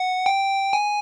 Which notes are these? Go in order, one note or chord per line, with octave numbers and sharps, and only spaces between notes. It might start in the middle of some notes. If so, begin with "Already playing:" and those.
Already playing: F#5
G5
G#5